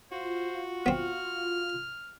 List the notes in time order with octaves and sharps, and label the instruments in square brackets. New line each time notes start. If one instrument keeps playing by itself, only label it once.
[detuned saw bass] F4 [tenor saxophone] F#4 [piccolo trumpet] C5
[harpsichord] B3 C4 [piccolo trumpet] F6